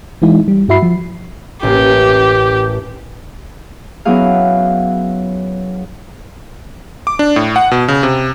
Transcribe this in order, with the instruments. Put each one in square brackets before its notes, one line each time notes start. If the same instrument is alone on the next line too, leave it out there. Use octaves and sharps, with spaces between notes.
[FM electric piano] E3 G#3 D#4 E4
G3
G2 E4 F#4 E5 B5 C7
F3
[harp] A1 A#3 [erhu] G4
[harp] F#3 B3 C#4 E4 G#4 F5
[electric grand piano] D6
D4
A2
F#5
B2
C#3
C3